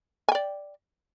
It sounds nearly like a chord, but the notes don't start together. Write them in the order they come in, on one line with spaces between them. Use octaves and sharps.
G#5 G5 D5